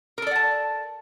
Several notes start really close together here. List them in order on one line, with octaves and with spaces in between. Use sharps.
A#4 A4 D5 F#5 A5